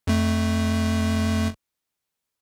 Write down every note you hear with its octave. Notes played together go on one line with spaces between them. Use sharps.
F2 A3